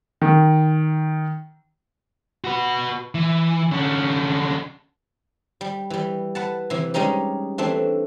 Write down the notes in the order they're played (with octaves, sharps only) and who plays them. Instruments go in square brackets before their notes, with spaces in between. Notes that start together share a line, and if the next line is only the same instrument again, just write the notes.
[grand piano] D#3
[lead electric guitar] F#4 B4
E3
D3 C#4
[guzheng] G3
E3 G3
B4 F#5 A5
C3 E3
G3 G#3 C#4 D#4 G4
E3 A3 C4 D4